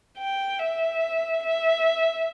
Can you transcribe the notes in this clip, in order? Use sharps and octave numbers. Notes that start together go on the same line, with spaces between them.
G5
E5
E5